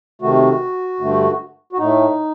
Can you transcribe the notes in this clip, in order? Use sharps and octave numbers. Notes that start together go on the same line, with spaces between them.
C3 D#3 A3 F#4
G2 D3 A3
F#4
A2 A3 D#4